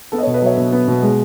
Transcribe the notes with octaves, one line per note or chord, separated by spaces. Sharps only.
B3 A4
D#5
A4 C#5
B2
B4 D#5
F#3 C#5 E5
B2
B3
B2
G#3